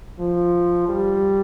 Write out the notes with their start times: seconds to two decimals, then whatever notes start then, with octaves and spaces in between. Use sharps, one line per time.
0.19 F3
0.89 G3